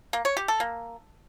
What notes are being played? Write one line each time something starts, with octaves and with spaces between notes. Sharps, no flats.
A#3
C#5
G4
A4
A#3